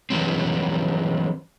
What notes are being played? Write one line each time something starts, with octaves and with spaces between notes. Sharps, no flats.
E3 F#3 G3 C4